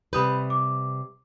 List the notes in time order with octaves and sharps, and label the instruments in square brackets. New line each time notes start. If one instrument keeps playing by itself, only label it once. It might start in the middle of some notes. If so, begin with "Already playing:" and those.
[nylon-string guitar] C3 G3 B4 [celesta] B5 D#6 G6
[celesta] D6